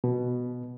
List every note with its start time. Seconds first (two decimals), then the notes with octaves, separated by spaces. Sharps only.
0.04 B2